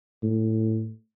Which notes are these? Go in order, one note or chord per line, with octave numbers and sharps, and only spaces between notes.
A2